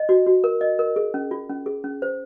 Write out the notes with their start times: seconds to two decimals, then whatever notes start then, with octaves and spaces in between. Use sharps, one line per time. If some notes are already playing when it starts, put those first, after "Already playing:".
Already playing: D#5
0.09 F#4
0.26 F#4
0.44 A#4
0.61 D#5
0.79 A#4
0.96 G#4
1.14 C#4
1.31 F4
1.49 C#4
1.66 G#4
1.84 C#4
2.02 C5